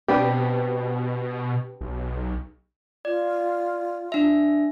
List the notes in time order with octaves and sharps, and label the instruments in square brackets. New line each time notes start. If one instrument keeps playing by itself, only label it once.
[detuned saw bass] B2 [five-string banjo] B3 C4 D4 [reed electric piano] G4 B4
[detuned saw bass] B1
[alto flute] F4 [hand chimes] D5
[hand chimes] D4 E5